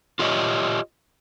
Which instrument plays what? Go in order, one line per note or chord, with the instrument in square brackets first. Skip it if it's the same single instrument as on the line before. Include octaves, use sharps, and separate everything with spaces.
[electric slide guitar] F4 G4 C#5 D#5